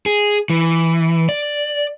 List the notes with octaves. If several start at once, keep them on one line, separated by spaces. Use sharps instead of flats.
G#4
E3
D5